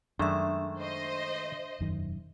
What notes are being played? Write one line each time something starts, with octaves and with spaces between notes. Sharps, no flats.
F#2 D#3 G#3 A3 D4 E5
C5 D#5
E1 F#2 D#3